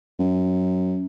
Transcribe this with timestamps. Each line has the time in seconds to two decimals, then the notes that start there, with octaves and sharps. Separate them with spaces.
0.19 F#2